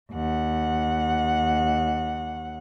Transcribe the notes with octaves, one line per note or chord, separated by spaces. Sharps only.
D#2 F#5